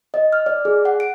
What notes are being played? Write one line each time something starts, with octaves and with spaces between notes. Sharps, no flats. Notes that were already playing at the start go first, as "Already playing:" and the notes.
D#5
F6
D5
G#4
F#5
D7